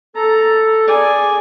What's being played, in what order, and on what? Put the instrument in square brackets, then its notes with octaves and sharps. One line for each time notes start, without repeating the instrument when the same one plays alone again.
[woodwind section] A4 [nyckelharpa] A#5
[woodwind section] G#4 D5 [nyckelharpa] G#5